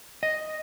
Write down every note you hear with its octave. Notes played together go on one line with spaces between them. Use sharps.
D#5